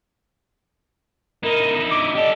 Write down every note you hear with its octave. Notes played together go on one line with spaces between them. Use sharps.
D#4 E4 A#4
D6
G4 A4 D5 D#5